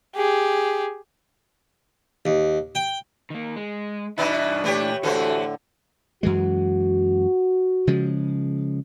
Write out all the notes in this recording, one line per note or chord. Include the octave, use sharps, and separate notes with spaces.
G4 G#4
D#2
G5
D#3 A#3
G#3
G2 B2 E3 D4 D#4 E5
A#2 E3 A3 G4 C#5
A2 D3 E3 A3 F#4 A4 C5
F#2 E3 G#3 F#4
C#3 F3 G#3